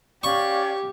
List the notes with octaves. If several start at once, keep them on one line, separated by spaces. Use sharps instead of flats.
C#4 G4 D5 F5 C#6